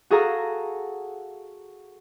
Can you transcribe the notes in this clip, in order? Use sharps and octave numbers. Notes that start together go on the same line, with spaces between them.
F#4 G#4 A4 F5 A#5